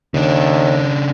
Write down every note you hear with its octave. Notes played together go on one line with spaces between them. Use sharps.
D#2 C#3 D4